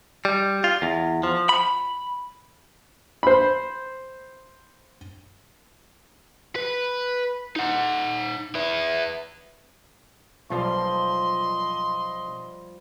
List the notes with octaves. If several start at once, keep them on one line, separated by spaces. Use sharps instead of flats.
G3
F4
E2
F3
B5
C5 B5
B4
D#4 F#5
B3 E4
B1 F3 G3 F4 D#5 C6